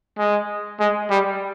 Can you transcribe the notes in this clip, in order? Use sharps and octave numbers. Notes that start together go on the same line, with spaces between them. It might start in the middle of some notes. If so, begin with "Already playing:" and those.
G#3
G#3
G3